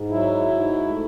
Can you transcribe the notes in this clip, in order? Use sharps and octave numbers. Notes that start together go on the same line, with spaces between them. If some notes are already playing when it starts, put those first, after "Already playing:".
Already playing: G#2
F#3 E4
G#2
A3